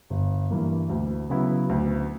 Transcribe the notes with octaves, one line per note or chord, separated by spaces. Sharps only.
G1
G2 E3 A#3
D2
C#3 F#3 B3 E4
D2